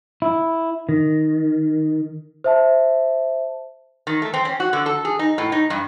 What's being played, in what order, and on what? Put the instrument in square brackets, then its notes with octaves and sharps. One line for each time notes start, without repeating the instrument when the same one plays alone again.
[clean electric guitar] E4
D#3
[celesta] C5 E5 A5
[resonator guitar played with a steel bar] D#3
A3
C4
C#4
F#4
D3
A4
G#4
D#4
A2
D#4
G2